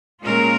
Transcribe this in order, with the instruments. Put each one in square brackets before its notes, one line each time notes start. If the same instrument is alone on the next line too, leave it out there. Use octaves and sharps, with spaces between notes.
[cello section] A#2 G#3 C#4 F4 A#4